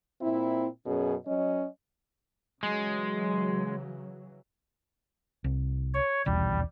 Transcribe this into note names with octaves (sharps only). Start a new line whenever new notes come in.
A#2 C4 E4
F#2 B2 C#4 G#4
F#3 C#4 D#5
C#3 E3 F#3 G#3
C2
C#5
D#1 B1 E2 G3